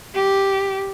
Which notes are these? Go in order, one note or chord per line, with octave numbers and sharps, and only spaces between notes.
G4